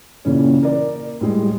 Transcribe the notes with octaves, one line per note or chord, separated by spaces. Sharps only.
A#2 C#3 E3 C#4
A#4 D5
A2 G3 G#3